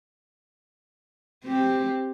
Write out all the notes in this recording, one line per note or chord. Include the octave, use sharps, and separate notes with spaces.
C4 G4